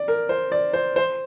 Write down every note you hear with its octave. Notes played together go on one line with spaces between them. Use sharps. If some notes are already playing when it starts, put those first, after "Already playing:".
Already playing: D5
A#4
C5
D5
C5
C5